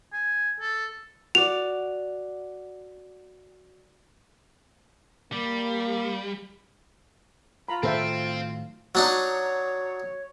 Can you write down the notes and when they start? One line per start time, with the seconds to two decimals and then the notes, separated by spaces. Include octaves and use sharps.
0.13 G#5
0.60 A4
1.35 F#4 D5 F7
5.33 G3 A#3
7.68 F4 A#5 B5
7.83 A2 D#3 F#3 C4 A4 C5 E5
8.95 F#3 D4 D#4 C#5